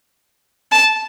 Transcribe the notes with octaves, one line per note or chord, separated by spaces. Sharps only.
A5